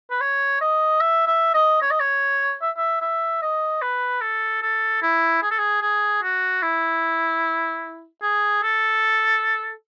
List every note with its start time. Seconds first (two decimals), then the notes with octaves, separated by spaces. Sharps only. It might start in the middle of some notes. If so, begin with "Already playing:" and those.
0.11 B4
0.21 C#5
0.61 D#5
1.01 E5
1.27 E5
1.54 D#5
1.82 C#5
1.91 D#5
2.01 C#5
2.62 E5
2.78 E5
3.02 E5
3.42 D#5
3.82 B4
4.21 A4
4.62 A4
5.02 E4
5.43 G#4
5.51 A4
5.58 G#4
5.82 G#4
6.23 F#4
6.62 E4
8.23 G#4
8.63 A4